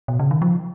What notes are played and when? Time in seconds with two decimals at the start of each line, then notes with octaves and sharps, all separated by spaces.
0.08 B2
0.19 C#3
0.31 D#3
0.42 F3